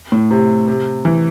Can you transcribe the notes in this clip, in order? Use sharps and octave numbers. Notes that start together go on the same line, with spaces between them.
A2
C3
C3
E3